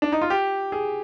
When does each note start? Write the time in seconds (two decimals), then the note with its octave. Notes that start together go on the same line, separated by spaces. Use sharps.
0.02 D4
0.12 D#4
0.22 F4
0.30 G4
0.72 G#4